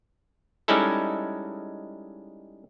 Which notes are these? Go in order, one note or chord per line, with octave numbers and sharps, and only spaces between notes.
G3 G#3 C#4 D#4 E4 A4